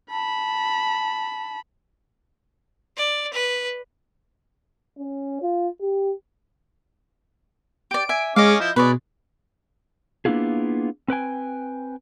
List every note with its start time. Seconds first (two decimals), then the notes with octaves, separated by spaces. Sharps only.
0.10 A5 B5
2.97 D5
3.33 B4
4.98 C#4
5.42 F4
5.81 G4
7.91 G4 D5 D7
8.09 E5 G#5
8.36 G#3 C#4 G#4 D#5 F5 D6
8.60 F3 E4 G6
8.76 B2 G#3 B4 C#5 D5
10.25 A#3 B3 D4 E4 F4 G#4
11.08 C4 B4 G5 G#5